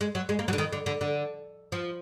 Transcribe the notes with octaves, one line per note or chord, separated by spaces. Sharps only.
G#3
F#3
G#3
A#3
F#3
D3
D#3
D3
D3
D3
F3